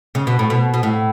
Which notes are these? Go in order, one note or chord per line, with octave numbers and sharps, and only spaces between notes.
C#3
B2
A2
B2
B2
A2